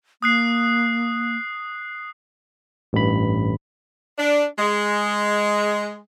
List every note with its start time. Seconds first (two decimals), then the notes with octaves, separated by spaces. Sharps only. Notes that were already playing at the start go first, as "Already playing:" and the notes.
0.23 A#3 D#6 F#6 C7
2.93 A1 G2 B5
4.19 D4
4.58 G#3